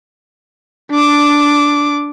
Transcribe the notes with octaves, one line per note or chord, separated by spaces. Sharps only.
D4 D6